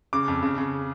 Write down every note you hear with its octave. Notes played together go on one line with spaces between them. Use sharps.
C#3 D6
F2
C#3
C#3